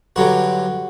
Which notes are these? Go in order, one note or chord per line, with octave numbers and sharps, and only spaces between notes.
G2 D3 F#3 F#4